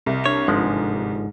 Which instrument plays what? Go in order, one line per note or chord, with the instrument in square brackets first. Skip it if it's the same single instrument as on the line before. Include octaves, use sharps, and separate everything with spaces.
[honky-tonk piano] C2 [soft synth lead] D#5
[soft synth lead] D4 [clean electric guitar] C#5
[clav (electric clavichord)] G1 F3 G#3 [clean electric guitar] G#2